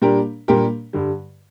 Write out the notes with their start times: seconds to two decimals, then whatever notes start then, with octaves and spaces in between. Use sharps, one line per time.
0.02 A#2 G3 D4 G4 A#4
0.48 A#2 G3 D4 G4 A#4
0.93 G2 D3 G3